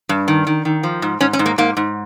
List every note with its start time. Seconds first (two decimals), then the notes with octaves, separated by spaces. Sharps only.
0.09 G2
0.28 D#3
0.47 D#3
0.65 D#3
0.83 F3
1.02 G#2
1.21 G#2 C#4
1.33 C#4
1.39 G#2
1.46 A#3
1.58 G#2 A#3
1.77 G#2